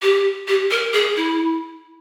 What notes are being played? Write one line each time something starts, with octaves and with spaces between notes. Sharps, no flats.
G4
G4
A#4
G#4
E4